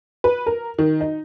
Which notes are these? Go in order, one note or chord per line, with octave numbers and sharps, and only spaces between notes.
B4
A#4
D#3
D#4